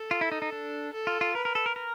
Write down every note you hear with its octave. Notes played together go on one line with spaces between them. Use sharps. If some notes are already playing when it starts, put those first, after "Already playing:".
Already playing: A4
F4
E4
D#4
D#4
D4
A4
F4
F4
A#4 B4
A#4
A4
A#4
A#4